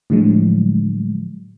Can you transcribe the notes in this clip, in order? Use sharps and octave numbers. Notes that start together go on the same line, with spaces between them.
A2 D3 F3 F#3 G#3